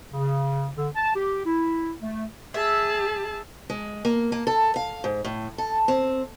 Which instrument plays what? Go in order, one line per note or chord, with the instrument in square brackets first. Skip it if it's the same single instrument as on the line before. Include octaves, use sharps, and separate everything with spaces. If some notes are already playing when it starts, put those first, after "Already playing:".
[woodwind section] C#3
D3
A5
G4
E4
A3
[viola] G#4 A5 [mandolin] E5
[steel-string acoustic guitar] G#3
A#3
A#3
A4
F5
G#2
A2
A4
C4